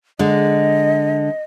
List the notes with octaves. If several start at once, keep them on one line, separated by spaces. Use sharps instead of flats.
D3 G#3 D#5